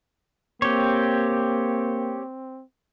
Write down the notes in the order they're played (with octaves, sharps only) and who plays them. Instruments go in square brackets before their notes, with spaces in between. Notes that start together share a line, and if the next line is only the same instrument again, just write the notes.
[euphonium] A#3 [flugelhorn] C4 [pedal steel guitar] G4 C#5